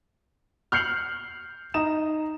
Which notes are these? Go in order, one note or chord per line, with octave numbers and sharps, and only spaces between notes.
F6 G6 C7 C#7 F7 F#7
D#4 A#5 D#6 E7